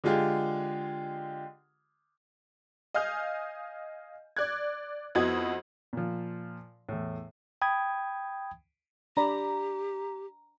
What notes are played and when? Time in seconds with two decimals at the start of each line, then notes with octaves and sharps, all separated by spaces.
0.04 D3 G#3 F4 G4 G#4
2.94 D#5 F5 G#5 F6 G6
4.37 D5 F#6 G#6
5.15 F2 B3 E4 F#4 D#5 G#6
5.93 A#2 F3
6.89 E2 A2
7.62 G5 B5 D#6 G#6
9.17 D4 G4 D5 A#5 B5